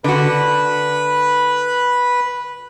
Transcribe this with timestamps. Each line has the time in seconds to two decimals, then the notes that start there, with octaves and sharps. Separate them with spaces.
0.04 D3 F#4 B4 B5